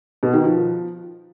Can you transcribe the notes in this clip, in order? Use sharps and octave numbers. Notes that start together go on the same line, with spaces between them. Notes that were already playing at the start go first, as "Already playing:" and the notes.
B2
D#3
F3